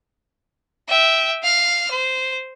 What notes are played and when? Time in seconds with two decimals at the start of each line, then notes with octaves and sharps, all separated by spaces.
0.89 E5 G5
1.43 F5 F6
1.90 C5